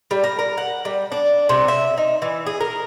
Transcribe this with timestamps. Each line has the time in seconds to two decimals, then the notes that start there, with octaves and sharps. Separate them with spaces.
0.11 G3
0.24 A#4
0.39 A#4
0.58 F#5
0.85 G3
1.12 D4
1.49 C3
1.68 E5
1.97 D#4
2.22 E3
2.46 G#4
2.61 A#4